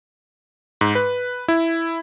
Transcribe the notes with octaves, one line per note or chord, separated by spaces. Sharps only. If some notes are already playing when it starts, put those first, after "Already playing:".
G#2
B4
E4